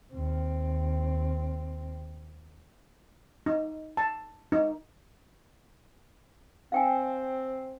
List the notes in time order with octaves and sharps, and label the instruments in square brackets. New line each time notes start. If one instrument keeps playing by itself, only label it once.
[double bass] D#2 C4
[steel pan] D#4
A5
D#4
[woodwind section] C4 [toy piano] F5 G5 G#5